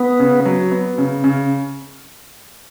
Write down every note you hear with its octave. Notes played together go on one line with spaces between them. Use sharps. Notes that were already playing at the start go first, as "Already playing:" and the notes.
Already playing: B3
C#3
F#3
B3
C#3
C#3